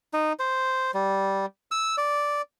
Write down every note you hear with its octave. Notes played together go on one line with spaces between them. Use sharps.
D#4
C5
G3
E6
D5